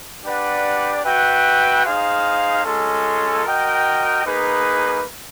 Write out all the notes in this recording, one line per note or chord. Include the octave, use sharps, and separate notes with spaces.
D4 G4 B4 D5 F#5
F#4 B4 E5 G5
D#4 G#4 C5 F5
G#3 C#4 F4 A4
F#4 A#4 D#5 G5
A#3 D#4 G#4 B4